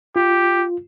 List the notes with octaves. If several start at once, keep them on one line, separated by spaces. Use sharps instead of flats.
F4 G4